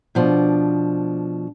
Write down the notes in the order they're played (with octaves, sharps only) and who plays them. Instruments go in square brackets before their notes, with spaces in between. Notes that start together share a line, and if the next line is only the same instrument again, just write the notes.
[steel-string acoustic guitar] B2 F3 D4